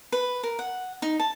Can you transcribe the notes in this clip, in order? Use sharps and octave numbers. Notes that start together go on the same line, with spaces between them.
B4
A#4
F#5
D#4
A5